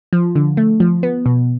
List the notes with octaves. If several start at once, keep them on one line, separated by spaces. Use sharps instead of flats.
F3
D3
A3
F3
B3
B2